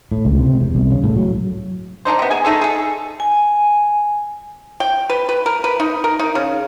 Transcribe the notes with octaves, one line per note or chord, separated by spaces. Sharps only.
A2
C#2
C3
E2
C2
C#3
A2
F#3
D#3 D4 D#4 C5
C3 B3
G#4 G#5
A3 D#4 G#4 A4
G#4 A4
G#5
G5
B4
B4
A#4
B4
D#4
A#4
D#4
C#3